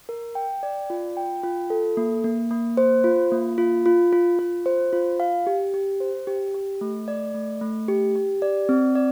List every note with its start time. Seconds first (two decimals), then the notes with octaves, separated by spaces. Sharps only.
0.09 A#4
0.35 G5
0.63 D5
0.90 F4
1.17 G5
1.44 F4
1.70 A4
1.97 A#3
2.24 A#3
2.51 A#3
2.77 C5
3.04 F4
3.32 A#3
3.58 F4
3.86 F4
4.13 F4
4.39 F4
4.66 C5
4.93 F4
5.20 F5
5.47 G4
5.74 G4
6.00 C5
6.27 G4
6.54 G4
6.81 A3
7.08 D5
7.34 A3
7.61 A3
7.88 G4
8.16 G4
8.42 D5
8.69 C4
8.95 D5